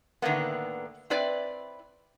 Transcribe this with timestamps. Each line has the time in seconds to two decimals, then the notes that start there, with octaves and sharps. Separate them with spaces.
0.22 A2 D3 D#3 A#3 B3
1.10 C4 E4 B4 D5